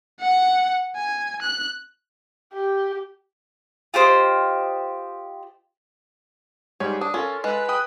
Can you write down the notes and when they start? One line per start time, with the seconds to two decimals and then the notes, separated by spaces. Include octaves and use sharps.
0.21 F#5
0.96 G#5
1.42 F#6
2.54 G4
3.94 F4 G4 C5 D#5
6.80 G#2 G3 G#4 C#5
7.01 D4 D#6
7.14 C#4 F4 A4 A#4
7.44 G#3 B4
7.69 G5 B5 D#6